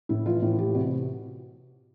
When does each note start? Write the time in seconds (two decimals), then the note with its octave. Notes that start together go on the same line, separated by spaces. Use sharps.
0.09 A2 E4
0.26 E3 F4
0.42 A2
0.58 E3 G4
0.74 C3 F#4